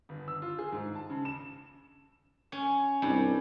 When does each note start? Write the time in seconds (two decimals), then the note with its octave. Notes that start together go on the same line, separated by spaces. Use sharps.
0.09 G1
0.28 E6
0.42 F4
0.59 G#4
0.72 G#2
0.95 A5
1.10 C#3
1.25 E7
2.52 C#4
3.02 C2 G2